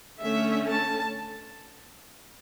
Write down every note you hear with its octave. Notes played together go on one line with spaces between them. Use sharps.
D3 A3 C#4 E5
A5